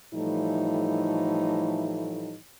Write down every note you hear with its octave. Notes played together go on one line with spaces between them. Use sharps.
A2 E3 F3 G3 A3 D#4